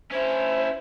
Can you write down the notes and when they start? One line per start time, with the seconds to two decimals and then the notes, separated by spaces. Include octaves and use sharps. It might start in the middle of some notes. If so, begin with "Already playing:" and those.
0.11 C#4 E4 C5